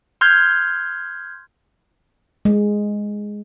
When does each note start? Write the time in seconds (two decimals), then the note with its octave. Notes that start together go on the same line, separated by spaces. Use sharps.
0.21 C6 F6 G6 G#6
2.45 G#3